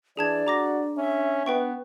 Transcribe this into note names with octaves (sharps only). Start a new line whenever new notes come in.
E3 D4 G#4 D5 A5 G#6
F#4 A#5 D6 A#6
C#4 E5
B3 B4 G5 C#6